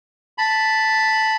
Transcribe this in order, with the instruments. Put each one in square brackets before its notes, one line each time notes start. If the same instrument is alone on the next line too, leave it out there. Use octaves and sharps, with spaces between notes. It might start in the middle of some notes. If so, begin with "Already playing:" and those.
[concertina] A5 B5